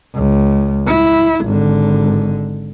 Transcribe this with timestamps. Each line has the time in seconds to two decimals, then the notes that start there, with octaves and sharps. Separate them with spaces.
0.15 C#2
0.87 E4
1.45 G#1 D3